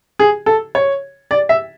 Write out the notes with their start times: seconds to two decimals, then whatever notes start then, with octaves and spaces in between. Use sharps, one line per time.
0.19 G#4
0.46 A4
0.75 C#5
1.31 D5
1.49 E5